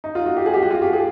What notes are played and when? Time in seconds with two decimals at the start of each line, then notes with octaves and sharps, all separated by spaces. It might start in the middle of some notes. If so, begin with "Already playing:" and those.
0.04 D#4
0.15 F4
0.26 F#4
0.37 G4
0.46 G#4
0.54 G4
0.63 F#4
0.70 F4
0.82 G4
0.93 G#4